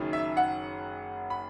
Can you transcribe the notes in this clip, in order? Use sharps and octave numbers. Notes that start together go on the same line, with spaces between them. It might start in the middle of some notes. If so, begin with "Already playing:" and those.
Already playing: F#1 F#2 D#3
E5
F#5
B5